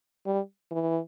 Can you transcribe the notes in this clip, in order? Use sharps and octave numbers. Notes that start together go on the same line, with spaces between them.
G3
E3